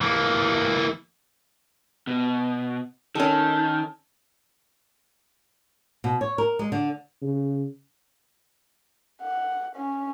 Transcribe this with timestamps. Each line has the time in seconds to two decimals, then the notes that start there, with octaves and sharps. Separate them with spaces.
0.01 E3 A#3
2.07 B2
3.15 D#3 C#4 A4
6.04 B2
6.21 C#5
6.38 A#4
6.59 G#3
6.72 D3
7.22 C#3
9.22 F#5
9.76 C#4